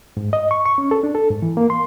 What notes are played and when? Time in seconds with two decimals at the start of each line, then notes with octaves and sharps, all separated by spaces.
0.17 G#2
0.33 D#5
0.51 C#6
0.66 C#6
0.78 C#4
0.91 A4
1.03 D4
1.15 A4
1.30 G#2
1.42 E3
1.57 A#3
1.70 C6